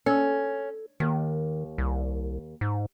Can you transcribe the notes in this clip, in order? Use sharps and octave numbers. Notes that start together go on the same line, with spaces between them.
C#4 A4
D#2 D#3
C2
G#2